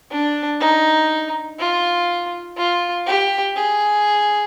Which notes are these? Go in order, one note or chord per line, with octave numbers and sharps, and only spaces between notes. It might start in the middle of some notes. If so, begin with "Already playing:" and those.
D4
D#4
F4
F4
G4
G#4